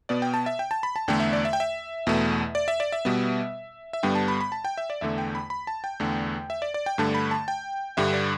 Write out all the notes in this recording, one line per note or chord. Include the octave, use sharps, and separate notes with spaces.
B2 B3 D5
G5
A5
E5
G5
A5
B5
A5
E2 D3 A3 G5
E5
D5
E5
G5
E5
E2 B2 A3
D5
E5
D5
E5
B2 G3 B3
E5
G2 D3 G3 B3 G5
A5
B5
B5
A5
G5
E5
D5
E2 D3 A3 E5
G5
B5
B5
A5
G5
E2 D3 A3
E5
D5
D5
G5
G2 D3 A3 A5
B5
A5
G5
G2 D3 G3 E5
D5